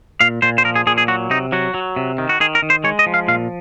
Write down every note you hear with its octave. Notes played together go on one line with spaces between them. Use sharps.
A#2 F5
A#2 C5
C5
F3 A#4
G#4
A#2 G#4
G#4
F#3 F#4
C3 D#4
F#3 F#4
F#3
C3
D#3
F#4
D#3 G#4
A#4
D#3
C5
G#3 C#5
D#5
F3
F5
A#2 F5